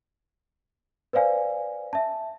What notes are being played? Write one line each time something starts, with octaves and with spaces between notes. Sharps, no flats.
B4 C5 D5 F5 G#5
E5 A5